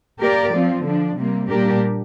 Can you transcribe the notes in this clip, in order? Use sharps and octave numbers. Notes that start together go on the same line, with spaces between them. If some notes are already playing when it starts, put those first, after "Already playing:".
A#3 G4 A#4 D5
F3 C4 F4
D3 F3 D4
C3 G3 A#3
A#2 G3 D4 G4 A#4